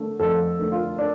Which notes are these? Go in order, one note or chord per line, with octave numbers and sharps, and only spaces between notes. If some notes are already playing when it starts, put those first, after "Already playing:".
Already playing: D3 A3
F2 A4
D3 A3
F4
D4